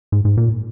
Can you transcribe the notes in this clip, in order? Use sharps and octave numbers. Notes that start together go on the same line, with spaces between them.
G#2
G#2
A#2